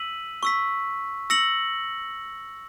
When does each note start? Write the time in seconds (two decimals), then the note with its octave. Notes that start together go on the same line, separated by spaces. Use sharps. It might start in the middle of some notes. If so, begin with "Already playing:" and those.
Already playing: E6 B6 D#7 F#7
0.43 C#6 E6 B6
1.30 E6 A#6 C#7 F#7